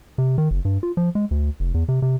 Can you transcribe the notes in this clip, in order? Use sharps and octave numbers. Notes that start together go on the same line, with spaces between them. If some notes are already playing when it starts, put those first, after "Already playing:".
C3
D#3
F#1
G2
F4
F3
G#3
D2
F1
E2
C3
C3